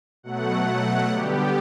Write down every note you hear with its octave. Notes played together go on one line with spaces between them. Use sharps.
B2 F#3 A3 F#5
D3 G3 B3 G4